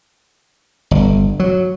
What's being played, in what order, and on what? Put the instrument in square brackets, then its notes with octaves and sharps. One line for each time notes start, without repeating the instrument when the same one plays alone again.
[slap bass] G1
F#3